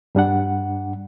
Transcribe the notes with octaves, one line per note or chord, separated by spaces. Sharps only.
G2 G3 D4 F#5